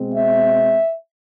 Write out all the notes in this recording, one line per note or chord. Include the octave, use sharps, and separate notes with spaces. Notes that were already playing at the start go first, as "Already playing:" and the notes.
Already playing: B2 G#3 C4
E5